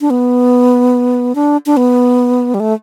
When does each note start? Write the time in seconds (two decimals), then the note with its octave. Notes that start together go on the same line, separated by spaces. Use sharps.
0.01 D4
0.10 B3
1.35 D4
1.66 D4
1.77 B3
2.54 G3
2.60 A3